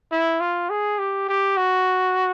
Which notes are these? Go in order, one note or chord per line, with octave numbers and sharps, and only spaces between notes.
E4
F4
G#4
G4
G4
F#4